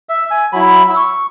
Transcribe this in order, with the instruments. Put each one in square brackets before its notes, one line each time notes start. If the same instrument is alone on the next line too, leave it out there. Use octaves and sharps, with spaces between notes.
[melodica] E5
G#5
F#3 E4 B5
E6
C#6